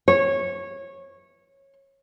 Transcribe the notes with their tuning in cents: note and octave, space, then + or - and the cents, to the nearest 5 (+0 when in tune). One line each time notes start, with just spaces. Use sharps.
C#5 -20